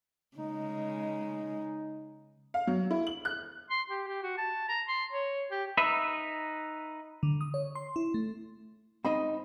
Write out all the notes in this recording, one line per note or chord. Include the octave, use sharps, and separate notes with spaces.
C#3 G#3 D#4
F5
F#3
E4
F#7
F#6
C6
G4
G4
F#4
A5
A#5
C6
C#5
G4
D#4 B4 E5
D3
D#6
C#5
C6
E4
A3
G#2 C4 D#4 D#5 B5